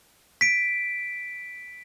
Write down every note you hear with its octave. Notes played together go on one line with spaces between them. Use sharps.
B6 D7